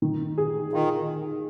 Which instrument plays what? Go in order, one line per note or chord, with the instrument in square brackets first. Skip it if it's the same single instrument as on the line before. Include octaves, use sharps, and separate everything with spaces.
[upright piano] D#3
G#4
[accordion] D#3 [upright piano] F4